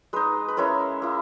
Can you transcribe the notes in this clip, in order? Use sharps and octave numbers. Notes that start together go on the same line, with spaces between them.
G#3 D#4 B4
B4
G#3 C#4 E4 A#4
A#3 E4